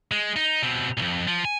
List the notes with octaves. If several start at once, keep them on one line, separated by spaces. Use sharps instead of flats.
G#3
D#4
B2 C4
B1 F2
F3
G#5